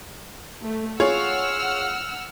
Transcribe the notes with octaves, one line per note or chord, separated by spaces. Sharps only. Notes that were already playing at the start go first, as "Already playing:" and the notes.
A3
F4 G#4 C#5 F#5 E6 F6